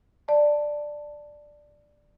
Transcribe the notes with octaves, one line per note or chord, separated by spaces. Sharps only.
D5 A5